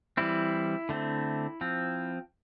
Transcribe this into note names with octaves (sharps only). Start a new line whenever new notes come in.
E3 G3 C4 E4
D3 A3 C4
F3 C4